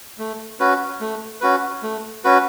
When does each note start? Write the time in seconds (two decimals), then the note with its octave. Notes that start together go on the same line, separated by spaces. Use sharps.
0.18 A3
0.60 C#4 F#4 B4
1.01 A3
1.41 C#4 F#4 B4
1.83 A3
2.24 C#4 F#4 B4